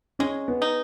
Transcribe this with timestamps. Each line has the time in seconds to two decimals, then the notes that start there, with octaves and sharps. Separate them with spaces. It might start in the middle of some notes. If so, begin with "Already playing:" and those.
0.19 G#3 C#4
0.48 B3
0.62 D#4